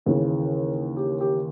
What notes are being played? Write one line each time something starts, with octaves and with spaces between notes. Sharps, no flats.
D#2 C#3 E3 G#4
G4
G4